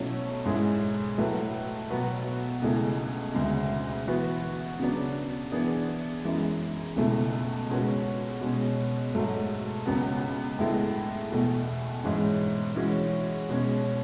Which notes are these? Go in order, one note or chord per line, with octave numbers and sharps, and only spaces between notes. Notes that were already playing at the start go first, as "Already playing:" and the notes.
Already playing: B2 F#3 A3 C#4 E4
G#2 G#3 C#4 E4 G#4
A2 F#3 A3 E4 B4
B2 F#3 B3 F#4 B4
C#2 B2 A3 E4 G#4
D2 C#3 G#3
E3 B3 F#4 B4
C#3 F#3 B3 D4
E3 B3 D4 G#4
F#2 E3 G#3
C#2 B2 A3 E4
B2 G#3 C#4 F#4 B4
B2 G#3 C#4
G#2 F#3 A3
C#2 C#3 F#3 B3
A2 G#3 B3 E4 A4
E2 B2 A3
G#2 E3 G#3 C#4
E3 G#3 C#4 F#4
B2 G#3 C#4